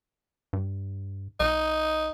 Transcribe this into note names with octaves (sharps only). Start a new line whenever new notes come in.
G2
B1 D#4